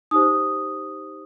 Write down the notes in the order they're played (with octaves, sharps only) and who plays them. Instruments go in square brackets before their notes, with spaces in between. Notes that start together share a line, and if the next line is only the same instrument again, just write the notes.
[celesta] D#4 G4 C5 D#6